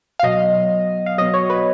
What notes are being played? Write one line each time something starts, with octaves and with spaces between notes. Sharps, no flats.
F5
B2 F#3 D#5
F5
B2 F#3 D#5
C#5
B4